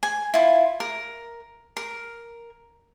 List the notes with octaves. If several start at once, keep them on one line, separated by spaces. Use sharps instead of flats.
G#5
E4 F4
A#4
A#4